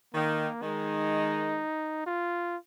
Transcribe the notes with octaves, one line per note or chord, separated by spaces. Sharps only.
D#3 A#3
D#3 G#3 D#4
F4